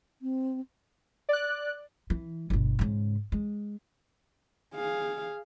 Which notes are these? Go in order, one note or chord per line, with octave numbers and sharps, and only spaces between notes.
C4
D5 F#6
E3
G1 B2
G#2 C#3
G#3
G#4 F5